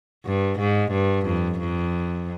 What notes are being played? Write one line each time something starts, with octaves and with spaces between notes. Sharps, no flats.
G2
G#2
G2
F2
F2